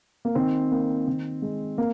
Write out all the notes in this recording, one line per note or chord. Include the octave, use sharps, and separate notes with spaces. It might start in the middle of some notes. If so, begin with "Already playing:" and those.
A#3
D#3 C4
A#3
D#3
G#3
A#3